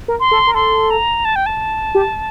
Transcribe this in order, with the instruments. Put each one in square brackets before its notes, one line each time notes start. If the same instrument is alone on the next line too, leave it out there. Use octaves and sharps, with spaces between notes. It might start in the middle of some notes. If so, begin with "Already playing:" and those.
[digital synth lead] A#4
[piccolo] C6
[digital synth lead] A4
A#4
[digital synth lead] A4 [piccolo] C6
[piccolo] A#5
A5
G5
A5
[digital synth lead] G4